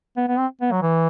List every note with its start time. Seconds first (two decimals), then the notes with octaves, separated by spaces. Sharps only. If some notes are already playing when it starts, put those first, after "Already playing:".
0.17 B3
0.28 B3
0.38 C4
0.61 B3
0.71 F#3
0.82 E3